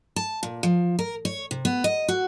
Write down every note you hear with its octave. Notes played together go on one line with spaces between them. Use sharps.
A5
A#2
F3
A#4
C#5
C3
B3
D#5
F#4